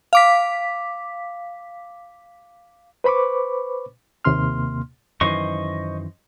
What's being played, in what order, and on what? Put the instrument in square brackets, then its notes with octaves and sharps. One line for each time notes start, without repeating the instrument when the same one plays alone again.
[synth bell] F5 D6 B6
[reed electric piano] B4 C5 B5 C#6 D6
D#2 C3 A#3 C6 F6
[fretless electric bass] F#2 D#3 E3 [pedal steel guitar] C5 D#5 C#6